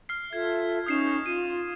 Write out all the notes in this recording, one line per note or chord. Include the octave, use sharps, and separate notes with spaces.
F6 C7
F4 A4 E5 G#6
C#4 D#4 D#6 G6 C7 E7
F4 D#7